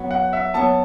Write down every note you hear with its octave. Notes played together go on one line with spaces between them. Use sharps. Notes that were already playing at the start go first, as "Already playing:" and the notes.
Already playing: F#3 B3 F#4
F#5
E5
F#3 B3 F#4 A5